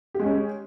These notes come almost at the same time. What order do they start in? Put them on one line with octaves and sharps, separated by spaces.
G4 G#3 C#4